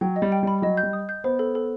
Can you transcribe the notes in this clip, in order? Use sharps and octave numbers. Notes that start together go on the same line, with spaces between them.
F#3 G5
D#5
G3
G5
G3 B5
F#3 D#5
G6
G3
D#6
G6
B3 C5
A4
A4